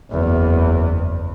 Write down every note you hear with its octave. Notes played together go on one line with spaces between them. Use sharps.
F#1 E2